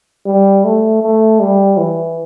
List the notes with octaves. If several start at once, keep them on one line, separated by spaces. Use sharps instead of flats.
G3
A3
A3
G3
E3